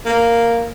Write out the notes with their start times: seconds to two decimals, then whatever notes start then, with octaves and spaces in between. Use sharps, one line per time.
0.06 A#3